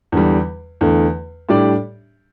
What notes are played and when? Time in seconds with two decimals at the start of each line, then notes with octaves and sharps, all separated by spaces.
0.12 E2 D3 G3
0.81 E2 D3 A3
1.49 A2 G3 D4 G4 D5